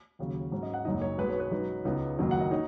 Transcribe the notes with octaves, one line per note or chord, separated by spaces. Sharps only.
D#2 C#3 F#3
G#2 F#3 C#4
D#5
F#5
F#1 F#2 F#3 D#4 D#5
C#5
B1 B2 G#3 B4
C#5
B4
F#2 F#3 D#4
C#2 C#3 B3 D#4
F#1 F#2 D#3 F#3 D#4
F#5
D#5
D#4 C#5